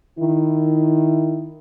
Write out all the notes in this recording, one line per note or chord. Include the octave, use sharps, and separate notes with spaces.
D#3 E4